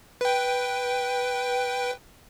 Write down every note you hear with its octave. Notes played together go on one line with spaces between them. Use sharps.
B4 G5